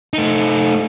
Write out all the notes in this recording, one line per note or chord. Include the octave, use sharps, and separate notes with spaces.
A3 D#4